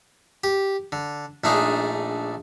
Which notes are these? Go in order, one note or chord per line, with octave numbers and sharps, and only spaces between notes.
G4
D3
A#1 A3 D4 D#4 G#4